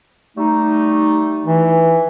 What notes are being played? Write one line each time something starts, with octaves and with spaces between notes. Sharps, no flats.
G3 A3 D#4
E3